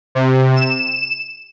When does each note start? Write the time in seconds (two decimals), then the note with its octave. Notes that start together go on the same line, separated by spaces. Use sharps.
0.15 C3
0.56 E7